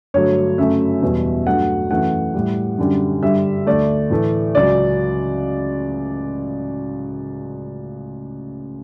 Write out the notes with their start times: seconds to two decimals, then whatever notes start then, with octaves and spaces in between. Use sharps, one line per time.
0.14 G2 D3 F#3 A3 C#5
0.58 F#2 C#3 F#3 A3 E5
1.02 E2 B2 G3
1.47 G2 F#3 A3 F#5
1.91 F#2 E3 A3 F#5
2.34 A2 G3
2.78 F#2 D3 G3
3.23 G2 D3 G3 E5
3.67 D2 D3 A3 D5
4.10 A2 E3 A3
4.55 C#2 C#3 F#3 D5